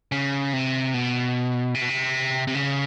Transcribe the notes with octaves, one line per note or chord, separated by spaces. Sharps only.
C#3
C3
B2
C3
B2
C3
C3
C#3